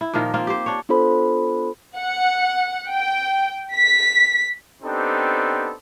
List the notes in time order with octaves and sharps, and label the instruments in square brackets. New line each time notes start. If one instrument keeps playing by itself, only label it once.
[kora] E4
A#2 D#3 F3 A#3
A#3 C4 F4
G4 C5
D4 C#5
[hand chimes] B3 D4 F4 A4 C5 B5
[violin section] F#5
G5
B6
[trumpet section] B3 C4 D4 D#4 G4 A4